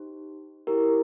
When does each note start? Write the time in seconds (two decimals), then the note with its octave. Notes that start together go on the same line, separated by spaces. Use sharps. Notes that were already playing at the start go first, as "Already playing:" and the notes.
Already playing: D#4 G4 C5
0.67 E4 G4 A#4